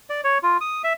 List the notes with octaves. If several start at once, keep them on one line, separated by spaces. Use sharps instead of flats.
D5
C#5
F4
D#6
E5